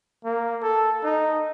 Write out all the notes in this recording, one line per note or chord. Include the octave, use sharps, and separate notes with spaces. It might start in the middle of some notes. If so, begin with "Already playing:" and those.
A#3
A4
D#4